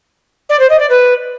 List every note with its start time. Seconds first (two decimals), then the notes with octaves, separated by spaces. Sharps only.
0.49 D5
0.59 C5
0.69 D#5
0.79 D5
0.89 B4